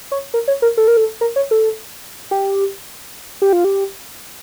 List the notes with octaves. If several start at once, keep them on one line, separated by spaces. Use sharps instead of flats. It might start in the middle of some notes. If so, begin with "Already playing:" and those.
C#5
A#4
C#5
A#4
A4
A#4
A4
A#4
C#5
A4
G4
G4
F4
G4